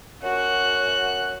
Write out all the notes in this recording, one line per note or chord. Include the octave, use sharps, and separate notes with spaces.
F#2 F#4 F#6